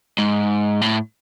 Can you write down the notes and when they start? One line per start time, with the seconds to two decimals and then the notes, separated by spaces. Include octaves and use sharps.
0.18 G#2
0.81 A2